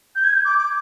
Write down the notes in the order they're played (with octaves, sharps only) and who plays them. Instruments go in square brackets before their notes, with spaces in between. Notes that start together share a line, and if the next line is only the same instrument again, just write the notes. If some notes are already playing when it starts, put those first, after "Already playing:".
[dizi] G6
G#6
G6
D6
D6